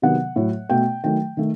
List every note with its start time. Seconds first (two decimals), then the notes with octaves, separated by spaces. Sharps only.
0.02 C3 D#3 F#3 B3 F#5
0.36 A2 F#3 A3
0.70 B2 A3 G5
1.04 D#3 F#3 A3 G5
1.37 D#3 A3